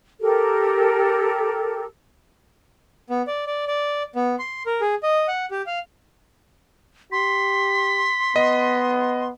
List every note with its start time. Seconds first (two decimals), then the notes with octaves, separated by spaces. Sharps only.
0.21 G4 A4 A#4
3.10 B3
3.27 D5
3.47 D5
3.68 D5
4.16 B3
4.39 C6
4.66 A#4
4.81 G#4
5.03 D#5
5.28 F#5
5.51 G4
5.67 F5
7.12 G4 C6 B6
8.36 B3 D#5